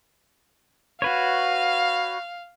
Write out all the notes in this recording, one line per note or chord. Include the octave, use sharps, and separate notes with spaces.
F#4 B4 C#5 F5